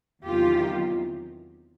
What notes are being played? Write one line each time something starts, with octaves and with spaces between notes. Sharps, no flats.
E2 C3 D#3 F#3 F4 G4